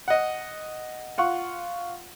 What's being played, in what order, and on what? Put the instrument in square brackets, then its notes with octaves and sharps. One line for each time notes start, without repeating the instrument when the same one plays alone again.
[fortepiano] D#5 F#5
F4 F#5 C#6